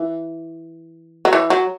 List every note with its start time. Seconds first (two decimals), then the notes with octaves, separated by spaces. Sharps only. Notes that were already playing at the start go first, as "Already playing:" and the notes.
Already playing: E3
1.25 F#3
1.33 E3
1.50 F#3